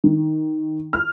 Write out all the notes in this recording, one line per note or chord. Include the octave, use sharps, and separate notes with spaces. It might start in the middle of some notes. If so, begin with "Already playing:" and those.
D#3
F6